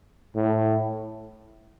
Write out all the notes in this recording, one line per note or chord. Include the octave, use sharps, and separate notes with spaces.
A2